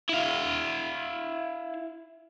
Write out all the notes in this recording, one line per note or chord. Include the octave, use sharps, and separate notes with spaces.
E4 F5